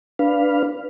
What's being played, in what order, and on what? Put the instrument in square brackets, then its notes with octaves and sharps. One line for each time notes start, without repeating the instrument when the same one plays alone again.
[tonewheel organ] D4 B4 F5